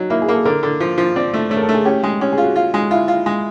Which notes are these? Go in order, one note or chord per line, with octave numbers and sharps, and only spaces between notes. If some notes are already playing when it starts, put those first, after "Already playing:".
Already playing: F#3 D#4
A#3 E4
G#4
A#3
A4
D3 A#4
D3
F3
F3
C4 D5
A3
A3 C#5
A#4
A4
A3
G#4
C#4 G4
G#3
C#4 G4
G#4
F4
F#4
F4
G#3
E4 F4
F4
G#3